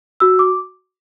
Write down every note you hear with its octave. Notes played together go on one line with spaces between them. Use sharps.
F#4 E6
D6